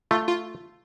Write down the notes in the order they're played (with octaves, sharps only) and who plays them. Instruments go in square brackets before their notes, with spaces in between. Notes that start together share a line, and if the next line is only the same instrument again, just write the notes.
[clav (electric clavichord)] A3 [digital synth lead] F4
[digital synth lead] F4